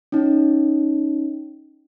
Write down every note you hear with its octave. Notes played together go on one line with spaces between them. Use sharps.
C#4 D#4